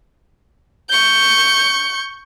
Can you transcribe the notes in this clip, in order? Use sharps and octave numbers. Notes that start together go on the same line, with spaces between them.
C#6 G6